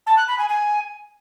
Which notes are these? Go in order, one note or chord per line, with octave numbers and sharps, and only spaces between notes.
A5
F#6
B5
G#5
G#5